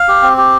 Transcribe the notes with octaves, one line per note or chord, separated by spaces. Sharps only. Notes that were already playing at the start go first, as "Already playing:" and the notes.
Already playing: F5
G4
C4
G4